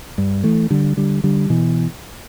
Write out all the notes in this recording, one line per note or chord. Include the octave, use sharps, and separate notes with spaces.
G2
E3 A3
D3 G3
D3 G3
D3 G3
B2 E3